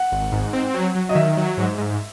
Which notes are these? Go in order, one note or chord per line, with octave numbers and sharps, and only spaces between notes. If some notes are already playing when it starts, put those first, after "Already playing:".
Already playing: F#5
G#1
G#2
C4
F#3
F#3
D#5
D#3 E5
F#3
G#2
G#2